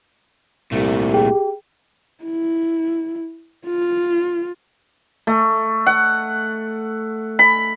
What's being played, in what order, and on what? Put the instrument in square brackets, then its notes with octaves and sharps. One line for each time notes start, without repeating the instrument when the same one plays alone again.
[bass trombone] C2 [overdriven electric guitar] A#2 A3 [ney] G4
[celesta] G#4 G5
[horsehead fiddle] E4
F4
[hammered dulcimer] A3
F#5
B5